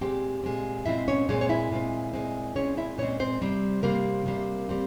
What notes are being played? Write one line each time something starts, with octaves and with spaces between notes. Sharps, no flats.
A#2 G#3 C4 G4 G5
A#2 G#3 C4
A#2 G#3 C4 E4 E5
C#4 C#5
A#2 G#3 C4 C#4 C#5
C#5
E4 E5
A#2 G#3 C4
A#2 G#3 C4
A#2 G#3 C4 C#4 C#5
E4 E5
A#2 G#3 C4 C#4 C#5
C4 C5
C3 G3 C4
C3 G3 A#3 C4 A#4
C3 G3 C4
G3 C4